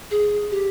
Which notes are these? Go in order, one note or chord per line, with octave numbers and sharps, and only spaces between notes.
G#4
G4